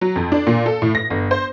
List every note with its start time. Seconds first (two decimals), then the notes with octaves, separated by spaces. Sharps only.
0.01 F#3
0.16 F2
0.32 D4
0.47 A#2
0.66 A4
0.82 A2
0.95 A#6
1.10 G1
1.31 C5